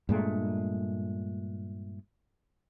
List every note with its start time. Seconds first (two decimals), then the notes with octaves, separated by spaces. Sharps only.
0.09 G2 A#2 G#3 A3